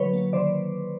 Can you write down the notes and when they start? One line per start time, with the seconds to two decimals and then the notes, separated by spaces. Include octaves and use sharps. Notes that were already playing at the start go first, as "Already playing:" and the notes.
Already playing: D3 F#3 B4 C#5
0.13 A#3
0.33 D#3 C5 D5